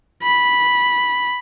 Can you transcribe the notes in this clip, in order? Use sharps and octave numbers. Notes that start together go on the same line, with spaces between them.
B5